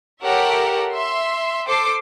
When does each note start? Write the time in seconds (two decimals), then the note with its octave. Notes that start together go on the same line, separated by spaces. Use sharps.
0.23 G4 A4 A#4 C#5 E5 F#5
0.92 E5 C6
1.66 A4 C5 D6 C7